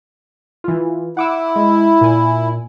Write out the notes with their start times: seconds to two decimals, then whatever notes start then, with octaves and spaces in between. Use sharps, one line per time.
0.64 E3 F4
1.17 E4 F#5 D6 E6
1.56 G#3
2.01 A#2 G#5